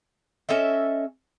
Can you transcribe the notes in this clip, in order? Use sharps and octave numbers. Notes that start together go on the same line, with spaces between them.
C#4 A4 D#5 E5